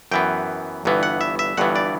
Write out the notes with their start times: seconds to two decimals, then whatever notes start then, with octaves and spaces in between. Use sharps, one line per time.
0.11 F#2 E3 B3 G5
0.85 G1 G2 E3 B3
1.03 F#5
1.21 E5
1.39 E5
1.57 G1 G2 E3 B3 F#5
1.76 D5